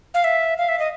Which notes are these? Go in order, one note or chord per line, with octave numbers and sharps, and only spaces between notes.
F5
E5
F5
E5
D#5